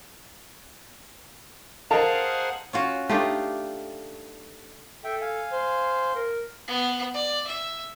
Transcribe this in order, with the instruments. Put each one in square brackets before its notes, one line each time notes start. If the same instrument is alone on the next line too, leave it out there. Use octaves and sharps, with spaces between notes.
[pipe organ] G#4 C5 F#5 [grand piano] A#4 D#5 A5 [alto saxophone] F5
[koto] C#4 F4 F#4
[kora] A3 G4 [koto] D4 D#4 F4
[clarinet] A4 [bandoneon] E5 G5
[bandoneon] F5 G#5
[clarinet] C5
A#4
[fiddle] B3
D5
E5